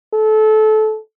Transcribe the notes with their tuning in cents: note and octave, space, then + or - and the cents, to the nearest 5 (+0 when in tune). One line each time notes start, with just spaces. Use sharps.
A4 -25